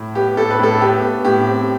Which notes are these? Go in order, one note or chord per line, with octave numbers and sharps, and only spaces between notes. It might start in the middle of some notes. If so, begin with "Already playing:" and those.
Already playing: A2
B3 G4
A2 A4
B4
A2 A4
B3 G4
B3
A2 G4
C4